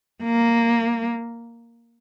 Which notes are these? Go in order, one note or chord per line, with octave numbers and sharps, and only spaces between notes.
A#3